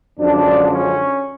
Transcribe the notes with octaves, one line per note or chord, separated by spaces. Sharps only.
F#2 D3 F3 G#3 D4
C#4